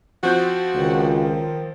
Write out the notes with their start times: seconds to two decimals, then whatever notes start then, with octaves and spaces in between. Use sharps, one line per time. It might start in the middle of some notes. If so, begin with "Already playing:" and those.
0.23 F3 C4 F#4 G6
0.75 C#2 D#3